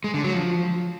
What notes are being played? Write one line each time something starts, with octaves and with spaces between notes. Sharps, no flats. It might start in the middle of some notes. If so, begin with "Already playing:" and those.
G#3
D3
F#3
F3